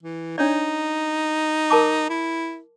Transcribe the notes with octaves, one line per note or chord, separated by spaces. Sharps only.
E3
D4 D#4 C#5 D5
A#4 A5 D6
E4